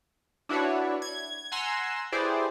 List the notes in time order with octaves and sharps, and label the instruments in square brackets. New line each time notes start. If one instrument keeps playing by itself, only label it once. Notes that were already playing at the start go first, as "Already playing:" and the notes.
[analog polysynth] D4 E4 F#4 B4 C#5
G#6
F#5 G#5 A#5 C6 E6
E4 G4 G#4 B4 C5 D5